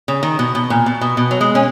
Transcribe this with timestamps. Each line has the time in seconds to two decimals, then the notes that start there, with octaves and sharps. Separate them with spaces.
0.08 C#3
0.23 D#3
0.39 B2
0.55 B2
0.70 A#2
0.86 B2
1.01 B2
1.17 B2
1.31 F#3
1.41 G#3
1.55 C#4